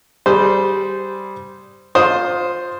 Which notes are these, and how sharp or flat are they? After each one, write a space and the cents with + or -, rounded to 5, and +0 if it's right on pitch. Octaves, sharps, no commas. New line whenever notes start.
G3 -10 G#4 +0 C5 -15
F4 +20 C5 +0 D#6 +0